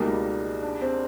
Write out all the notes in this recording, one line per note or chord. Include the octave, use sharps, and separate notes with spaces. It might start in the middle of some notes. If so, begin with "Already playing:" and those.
Already playing: C#2 B2 G3 A#3 D#4
D4
C4